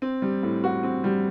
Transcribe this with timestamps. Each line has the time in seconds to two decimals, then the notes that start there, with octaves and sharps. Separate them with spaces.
0.02 C4
0.22 G3
0.43 A2
0.64 F#4
0.83 C4
1.04 G3